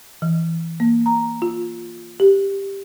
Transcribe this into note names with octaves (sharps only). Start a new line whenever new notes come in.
E3
A#3
A#5
F4
G4